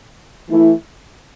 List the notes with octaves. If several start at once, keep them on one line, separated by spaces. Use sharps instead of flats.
E3 A3 E4